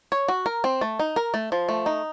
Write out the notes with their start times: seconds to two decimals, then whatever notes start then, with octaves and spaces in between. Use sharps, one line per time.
0.12 C#5
0.28 F#4
0.46 A#4
0.64 C4
0.81 A3
0.99 D#4
1.16 A#4
1.34 A3
1.52 F3
1.69 A3
1.86 D#4